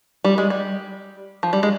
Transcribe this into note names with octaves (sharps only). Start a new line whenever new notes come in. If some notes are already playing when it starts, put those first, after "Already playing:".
G3
G#3
G3
F3
G3
G#3